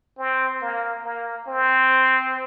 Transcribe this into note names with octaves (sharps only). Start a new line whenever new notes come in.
C4
A#3
A#3
C4